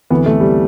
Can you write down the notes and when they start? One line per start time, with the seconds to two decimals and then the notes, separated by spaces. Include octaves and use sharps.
0.10 D2 C3 E3 B3
0.26 A3
0.40 G3